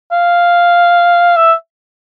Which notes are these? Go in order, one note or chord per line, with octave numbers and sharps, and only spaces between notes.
F5
E5